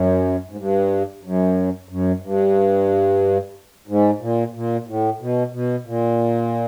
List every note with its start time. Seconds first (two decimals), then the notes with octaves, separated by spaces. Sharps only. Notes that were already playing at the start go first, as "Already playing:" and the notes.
Already playing: F#2
0.50 G#2
0.57 G2
1.23 F#2
1.89 F#2
2.22 G2
3.88 G#2
4.21 A#2
4.54 A#2
4.87 A2
5.20 B2
5.53 B2
5.86 A#2